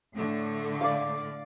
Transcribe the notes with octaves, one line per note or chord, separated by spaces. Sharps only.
A2 D3 A3
D5 F5